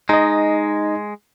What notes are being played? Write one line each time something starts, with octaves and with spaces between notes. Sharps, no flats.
G#3 D#4 D#5